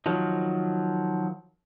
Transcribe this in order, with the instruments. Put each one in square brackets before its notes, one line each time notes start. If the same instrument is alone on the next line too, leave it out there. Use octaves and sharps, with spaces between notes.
[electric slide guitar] D#3 F3 F#3